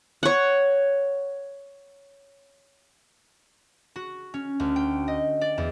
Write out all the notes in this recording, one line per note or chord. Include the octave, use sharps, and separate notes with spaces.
C#5 F#5
F#4
C#4
D2
G5
D#5
D5
E2